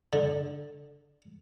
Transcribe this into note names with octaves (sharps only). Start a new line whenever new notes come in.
D3